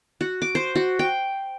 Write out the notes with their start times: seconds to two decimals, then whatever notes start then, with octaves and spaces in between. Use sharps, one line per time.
0.21 F#4
0.42 D6
0.55 C5
0.75 F#4
0.99 G5